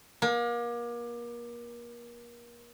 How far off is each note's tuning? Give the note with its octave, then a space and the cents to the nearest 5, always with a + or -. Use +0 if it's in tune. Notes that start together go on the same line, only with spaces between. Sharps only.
A#3 +35